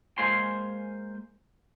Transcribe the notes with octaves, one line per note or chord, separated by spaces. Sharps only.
G#3 A#3 C5 F5 G#5 C6